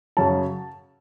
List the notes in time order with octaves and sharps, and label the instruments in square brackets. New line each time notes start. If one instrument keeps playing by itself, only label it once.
[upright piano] F#2 C#3 F#3 A5